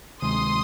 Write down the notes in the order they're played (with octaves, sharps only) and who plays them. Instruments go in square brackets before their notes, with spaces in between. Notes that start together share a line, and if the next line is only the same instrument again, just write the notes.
[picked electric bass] D2 C3 D#3 G#3 [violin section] C6 D#6